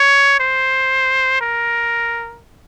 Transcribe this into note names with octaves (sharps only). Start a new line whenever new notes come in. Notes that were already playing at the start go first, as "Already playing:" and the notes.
Already playing: C#5
C5
A#4